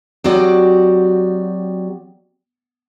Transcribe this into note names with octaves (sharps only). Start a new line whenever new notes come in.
F#3 C4 F#4 G4 D5 D#5